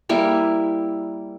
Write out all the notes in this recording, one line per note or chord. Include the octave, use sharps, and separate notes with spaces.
G3 A#3 E4